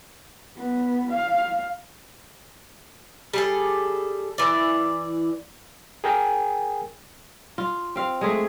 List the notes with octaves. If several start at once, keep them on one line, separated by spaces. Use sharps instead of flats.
B3
F5
G3 G#4 A4
E3 D5
G#4 A#4 G5 G#5
F4
C4 F5
G#3 A3 G#4